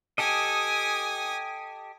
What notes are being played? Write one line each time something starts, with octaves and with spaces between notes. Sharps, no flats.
G4 A4 D#5 G#5 D#6